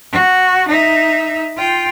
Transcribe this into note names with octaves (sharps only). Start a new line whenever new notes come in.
F#4
D#4 E5
F4 G5